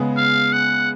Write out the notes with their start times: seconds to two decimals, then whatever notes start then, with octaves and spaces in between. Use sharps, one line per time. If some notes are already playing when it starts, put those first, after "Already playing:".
Already playing: C#3 G#3 B3
0.17 F5
0.53 F#5